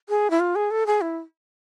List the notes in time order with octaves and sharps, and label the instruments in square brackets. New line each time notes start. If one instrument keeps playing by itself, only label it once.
[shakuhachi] G#4
E4
F4
G#4
A4
G#4
E4